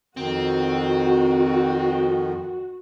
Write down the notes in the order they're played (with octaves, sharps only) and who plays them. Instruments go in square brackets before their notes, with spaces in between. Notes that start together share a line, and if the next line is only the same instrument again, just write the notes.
[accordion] F2 D#3 [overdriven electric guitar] C4 [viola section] F#4